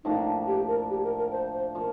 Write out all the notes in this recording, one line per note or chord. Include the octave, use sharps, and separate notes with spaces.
A2 F3 A#3 D4 D#4
G4
A#4
G4
A#4
A#4
C5
C5
F3 A#3 A#4